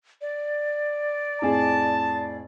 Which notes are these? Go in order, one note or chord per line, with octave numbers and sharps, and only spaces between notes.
D5
F2 A2 G#4 A5